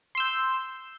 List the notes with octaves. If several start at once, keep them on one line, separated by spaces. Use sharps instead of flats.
C6 E6 G6